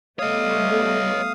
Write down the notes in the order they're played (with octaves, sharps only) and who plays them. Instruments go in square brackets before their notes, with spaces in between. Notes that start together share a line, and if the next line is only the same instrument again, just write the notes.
[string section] G3 A3 B3 [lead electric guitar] C#5 D#5 [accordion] F5 D#6